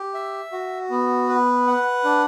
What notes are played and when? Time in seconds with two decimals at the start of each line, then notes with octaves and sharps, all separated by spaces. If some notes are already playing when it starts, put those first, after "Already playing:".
Already playing: G4
0.14 E5
0.52 F#4
0.90 B3
1.28 B4
1.67 F#5
2.04 D4